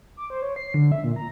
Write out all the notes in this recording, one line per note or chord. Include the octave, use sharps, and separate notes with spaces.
D6
C5
C#5
C7
D3
E5
A#2
A#5